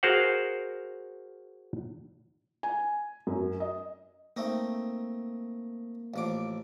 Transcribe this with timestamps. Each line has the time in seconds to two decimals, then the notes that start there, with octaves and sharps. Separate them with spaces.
0.03 F#4 G#4 A#4 C5 F5 F#5
2.63 G#5
3.27 F#2
3.60 D#5
4.36 A3 A#3 C4 D#4
6.14 A1 F3 D6